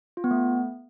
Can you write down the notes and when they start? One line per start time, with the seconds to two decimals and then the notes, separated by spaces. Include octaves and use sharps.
0.17 F4
0.24 B3
0.31 A3